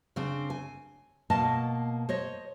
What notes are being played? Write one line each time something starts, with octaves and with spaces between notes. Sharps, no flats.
C#3 C4 D4
G#5
B2 A#3 D#5 A5
C5 C#5 D#5